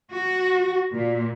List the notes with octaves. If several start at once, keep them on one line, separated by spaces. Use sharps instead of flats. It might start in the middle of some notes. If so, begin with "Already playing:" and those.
F#4
A#2